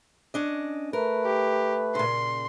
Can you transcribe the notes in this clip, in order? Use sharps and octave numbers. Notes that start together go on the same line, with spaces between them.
C#4 D4 D#5
A3 A#4 B4
G4
A#2 C#3 C6